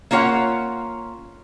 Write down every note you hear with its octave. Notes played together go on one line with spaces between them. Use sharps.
A#3 C#4 F4 C#5 F#5